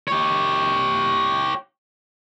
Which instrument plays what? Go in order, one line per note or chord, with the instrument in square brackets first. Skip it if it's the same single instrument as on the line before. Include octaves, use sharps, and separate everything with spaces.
[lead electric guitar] G4 C#5